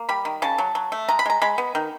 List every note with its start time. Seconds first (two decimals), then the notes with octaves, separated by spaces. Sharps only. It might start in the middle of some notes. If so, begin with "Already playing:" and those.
Already playing: A#3
0.09 G3 B5
0.25 D#3
0.42 C#3 A5
0.58 F#3
0.75 F#3
0.92 A3
1.08 G#3 A#5
1.19 B5
1.26 G#3 A#5
1.42 G#3 B5
1.58 B3
1.75 D#3